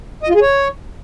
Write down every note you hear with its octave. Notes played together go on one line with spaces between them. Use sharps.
D#5
F4
G#4
C#5